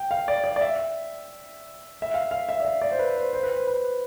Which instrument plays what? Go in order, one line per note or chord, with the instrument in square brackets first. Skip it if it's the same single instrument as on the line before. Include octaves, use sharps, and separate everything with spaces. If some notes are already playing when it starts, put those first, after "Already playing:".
Already playing: [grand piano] G5
F5
D5
D5
D5
E5
E5
F5
F5
E5
D5
E5
D5
C5
B4
C5
C5
B4
C5
B4